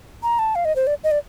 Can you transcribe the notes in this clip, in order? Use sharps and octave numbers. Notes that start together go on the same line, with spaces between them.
A#5
A5
F5
D#5
C5
D5
D#5
D5